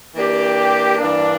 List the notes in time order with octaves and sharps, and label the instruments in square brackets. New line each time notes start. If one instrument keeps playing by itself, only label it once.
[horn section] E3 A#3 D4 G4
G2 E3 A#3 D4